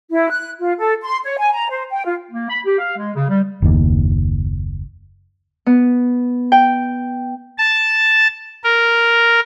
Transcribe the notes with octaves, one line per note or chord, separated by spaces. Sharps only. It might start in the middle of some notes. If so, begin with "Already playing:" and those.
E4
F#6
F4
A4
C6
C#5
G#5
A#5
C5
G5
F4
A#3
B5
G4
F5
G#3
C#3
G3
F#1 D#2
B3
G5
A5
A#4